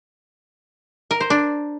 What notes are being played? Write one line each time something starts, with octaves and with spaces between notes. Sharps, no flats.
A#4
C5
D4